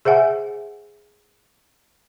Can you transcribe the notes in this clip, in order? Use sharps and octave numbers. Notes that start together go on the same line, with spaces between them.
G#4 C5 E5 F#5 G#5